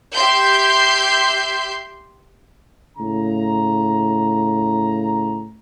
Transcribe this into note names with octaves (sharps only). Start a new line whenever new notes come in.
G4 E5 C6 G6
A2 C#3 A#5